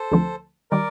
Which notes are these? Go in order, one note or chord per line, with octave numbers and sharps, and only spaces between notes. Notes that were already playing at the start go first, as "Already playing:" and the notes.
Already playing: A4 C5
D2 D3 F3 C4
D#3 G3 A#4 D5